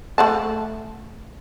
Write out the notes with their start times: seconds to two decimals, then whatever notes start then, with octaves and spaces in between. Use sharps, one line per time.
0.18 A3 F#5 A5